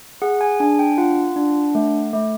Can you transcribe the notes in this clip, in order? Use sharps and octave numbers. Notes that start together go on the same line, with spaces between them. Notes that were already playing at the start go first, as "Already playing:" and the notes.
G#4 F#5
G#5
D4 G#5
G5
F4 F#5
D4
A3
A3